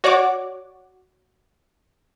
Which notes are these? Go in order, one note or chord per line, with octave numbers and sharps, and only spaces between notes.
F#4 C#5 D5 F#5 D6